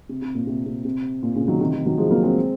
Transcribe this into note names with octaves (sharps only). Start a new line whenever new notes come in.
C3
C3
A#2
C3
C3
C3
A#2
A#2 C#3
D#3 F#3
C3 D#3
C3 D#3
D#3 F#3
F3 G#3
F#3 A#3
G#3 C4